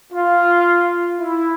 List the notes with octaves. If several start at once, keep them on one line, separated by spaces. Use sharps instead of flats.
F4
E4